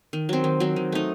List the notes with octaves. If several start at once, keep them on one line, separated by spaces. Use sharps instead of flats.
D#3
F#3 C4
D#3
F#3 C4
D#3
A3 D#4